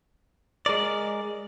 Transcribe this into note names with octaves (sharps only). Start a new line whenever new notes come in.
G#3 A#4 D5